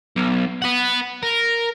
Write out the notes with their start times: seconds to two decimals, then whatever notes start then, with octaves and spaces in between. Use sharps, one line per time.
0.16 B1
0.62 B4 F#5
1.23 A#4